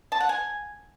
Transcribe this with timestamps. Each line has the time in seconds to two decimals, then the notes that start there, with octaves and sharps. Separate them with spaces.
0.12 A5
0.20 F#5
0.29 G#5